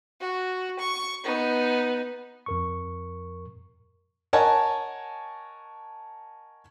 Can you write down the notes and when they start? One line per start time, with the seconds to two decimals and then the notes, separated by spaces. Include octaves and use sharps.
0.21 F#4
0.79 C#6
1.24 B3 D#4
2.46 F2 A#4 C#6
4.33 A#4 C#5 D#5 F#5 G#5 A5